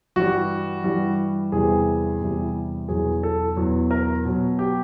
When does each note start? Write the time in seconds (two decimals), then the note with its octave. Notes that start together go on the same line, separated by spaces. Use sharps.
0.16 G2 E3 G3 F#4
0.84 G2 E3 G3
1.52 E2 C3 E3 G3 G#4
2.21 E2 C3 E3 G3
2.88 E2 B2 F#3 G#4
3.23 A4
3.57 E2 B2 F#3
3.91 A#4
4.25 B2 F#3
4.59 G4